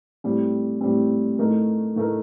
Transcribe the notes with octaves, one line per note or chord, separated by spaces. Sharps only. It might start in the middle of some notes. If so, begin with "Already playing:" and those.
A2 G3 C4
A2 G3 C4
A2 A3 D#4 A#4
A2 A3 D#4 A#4